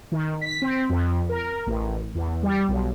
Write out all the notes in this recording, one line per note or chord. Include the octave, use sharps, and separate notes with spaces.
D#3
B6
C4
F2
A#4
A1
E2
G3
B1